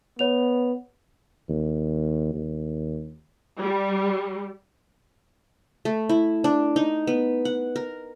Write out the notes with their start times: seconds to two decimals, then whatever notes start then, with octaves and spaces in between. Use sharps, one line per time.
0.19 B3 C#5 F7
1.49 D#2
2.34 D#2
3.57 G3
5.85 A3
6.09 E4
6.44 D4
6.76 D#4
7.07 B3
7.45 F#5
7.76 A#4